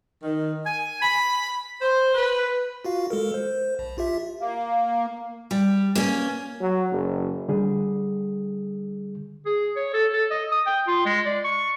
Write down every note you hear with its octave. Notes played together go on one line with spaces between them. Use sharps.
D#3
G#5
B5
C5
B4
F4 F#4 F5
G#3 A4 A#4
C5
A#1
F4 G4 E5
A#3
G3
A#3 C#4
F#3
F#1
D3 G3 G#4
G#4
C#5
A4
A4
D#5
D#6
G5
F4
G#3
D5
C#6